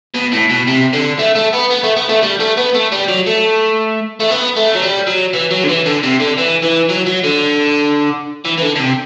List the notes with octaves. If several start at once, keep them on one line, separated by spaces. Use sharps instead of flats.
B2
A2
B2
C3
D3
A3
A3
B3
B3
A3
B3
A3
G3
A3
B3
A3
G3
F#3
A3
A3
B3
A3
F#3
G3
F#3
E3
F#3
D3
E3
D3
C3
D3
E3
E3
F#3
F#3
D3
E3
E3
D3
D3
C3